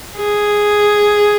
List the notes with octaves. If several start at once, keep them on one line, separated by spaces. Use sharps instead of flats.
G#4